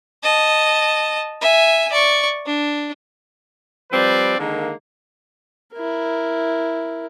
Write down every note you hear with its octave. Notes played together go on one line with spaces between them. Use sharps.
D#5 A5
E5 G#5
D5 C#6
D4
F3 G3 C4 B4 D5
D3 D#3 G#3 A#3
E4 A#4